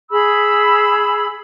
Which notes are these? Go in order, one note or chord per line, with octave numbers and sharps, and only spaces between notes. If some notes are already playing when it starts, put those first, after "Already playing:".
G#4 B5 E6